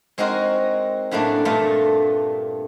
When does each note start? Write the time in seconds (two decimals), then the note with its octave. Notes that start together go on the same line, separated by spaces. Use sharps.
0.18 G#3 C4 D#4 F#4 A#4
1.11 F#2 A2 A3 A#3 D4
1.45 G2 A#2 A3 F4 A5